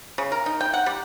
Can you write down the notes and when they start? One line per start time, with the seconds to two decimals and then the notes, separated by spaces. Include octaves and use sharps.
0.18 C#3
0.32 A#4
0.46 D#4
0.61 G5
0.73 F#5
0.86 G3